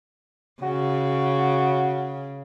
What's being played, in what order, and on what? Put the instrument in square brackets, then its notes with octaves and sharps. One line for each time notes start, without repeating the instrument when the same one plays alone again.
[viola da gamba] C#3 [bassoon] F#4